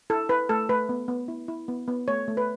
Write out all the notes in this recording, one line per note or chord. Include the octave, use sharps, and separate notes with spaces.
E4 A4
E4 B4
A3 A4
A3 B4
B3
B3
E4
E4
B3
B3
A3 C#5
A3
B4